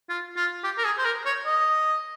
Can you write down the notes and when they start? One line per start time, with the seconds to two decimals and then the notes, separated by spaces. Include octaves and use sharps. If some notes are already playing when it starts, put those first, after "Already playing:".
0.09 F4
0.37 F4
0.64 G4
0.78 A#4
0.84 G#4
0.98 C5
1.05 A#4
1.26 C#5
1.46 D#5